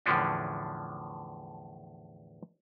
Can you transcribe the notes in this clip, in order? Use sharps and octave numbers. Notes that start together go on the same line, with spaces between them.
E2 A2 D3 F3 C#4 D4